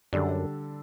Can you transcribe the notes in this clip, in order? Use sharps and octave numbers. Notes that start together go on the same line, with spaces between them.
F#2 D3 G3 D4 A4